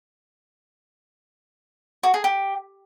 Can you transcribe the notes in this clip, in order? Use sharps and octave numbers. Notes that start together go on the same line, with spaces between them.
F#4
G#4
G4